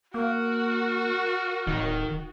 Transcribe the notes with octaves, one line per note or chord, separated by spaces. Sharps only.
A#3 F#4 A#4
D1 D#3